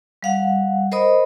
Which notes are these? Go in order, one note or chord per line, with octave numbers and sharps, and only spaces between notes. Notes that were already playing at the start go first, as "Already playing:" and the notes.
G3 F5 F#5
A#4 C5 D#5 B5 D#6